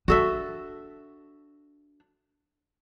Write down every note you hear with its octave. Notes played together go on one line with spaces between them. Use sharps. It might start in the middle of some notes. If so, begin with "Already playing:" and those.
D4 F#4 A4 E5